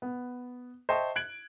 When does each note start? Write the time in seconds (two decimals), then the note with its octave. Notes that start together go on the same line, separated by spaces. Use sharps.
0.02 B3
0.89 C5 D#5 E5 G5 A5 C#6
1.16 F#6 G#6 D7 F#7